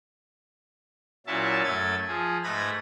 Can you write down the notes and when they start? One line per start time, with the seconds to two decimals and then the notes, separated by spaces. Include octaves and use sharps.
1.27 A#2 F#3 C#4 E4 E5 A5
1.64 F#2 A3 A4 G#6 A6
2.08 F3 G#4
2.44 G#2 A3 B4 B5 G#6 A#6